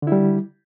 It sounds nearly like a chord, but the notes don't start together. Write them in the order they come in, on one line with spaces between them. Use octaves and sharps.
D3 E4 G3